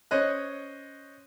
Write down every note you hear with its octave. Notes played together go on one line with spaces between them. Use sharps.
C#4 C5 C#5 D#5 F#6